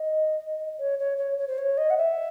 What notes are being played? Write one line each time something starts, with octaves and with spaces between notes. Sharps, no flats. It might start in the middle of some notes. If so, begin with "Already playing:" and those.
Already playing: D#5
C#5
C#5
C#5
C#5
C5
C#5
D#5
F#5
E5